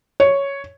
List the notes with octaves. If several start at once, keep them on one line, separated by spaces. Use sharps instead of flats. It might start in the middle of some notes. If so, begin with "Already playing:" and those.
C#5